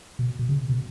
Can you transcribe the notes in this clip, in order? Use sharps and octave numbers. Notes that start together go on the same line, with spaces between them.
B2
B2
C#3
B2